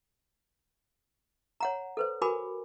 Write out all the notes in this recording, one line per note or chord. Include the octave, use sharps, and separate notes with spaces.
C#5 F#5 A#5
A4 B4 C5
F#4 A#4 G#5 B5 D6